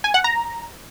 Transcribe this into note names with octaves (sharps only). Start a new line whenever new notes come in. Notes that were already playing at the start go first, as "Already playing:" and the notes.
G#5
F#5
A#5